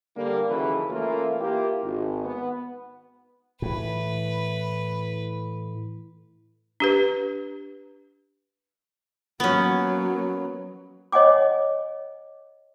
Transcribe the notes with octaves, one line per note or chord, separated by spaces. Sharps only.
D3 G3 A#3
D#2 C#3 E3 F#3 A4 B4
E3 A3 A#3 C#4 E4 F4
A#3 E4 F4 G4
G#1
B3
A2 E3 B4
D4 G4 B4
F#3 A#3 B3 C#4
C#5 D#5 F#5 G#5 D6